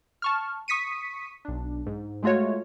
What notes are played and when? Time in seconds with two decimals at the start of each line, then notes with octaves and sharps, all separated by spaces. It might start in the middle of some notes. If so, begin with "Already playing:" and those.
0.22 A5 C#6 F6
0.68 C#6 D#6 B6 C#7 D#7
1.45 B1 D4
1.86 G#2
2.23 G#3 A3 F4 F#4 C#5